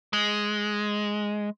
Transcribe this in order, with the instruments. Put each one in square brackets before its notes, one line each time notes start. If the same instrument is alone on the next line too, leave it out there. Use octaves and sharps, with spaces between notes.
[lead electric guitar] G#3